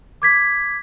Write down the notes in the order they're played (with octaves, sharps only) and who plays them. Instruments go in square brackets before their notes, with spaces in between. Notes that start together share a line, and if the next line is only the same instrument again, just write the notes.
[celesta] D6 G#6 B6